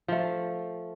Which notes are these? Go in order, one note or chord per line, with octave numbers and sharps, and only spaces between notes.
F3 A3